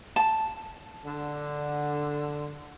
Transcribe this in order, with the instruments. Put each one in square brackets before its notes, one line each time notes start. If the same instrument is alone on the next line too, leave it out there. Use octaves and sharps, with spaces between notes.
[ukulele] A5
[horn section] D3